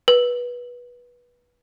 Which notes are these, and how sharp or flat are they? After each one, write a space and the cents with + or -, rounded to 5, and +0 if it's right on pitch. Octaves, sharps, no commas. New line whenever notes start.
B4 -20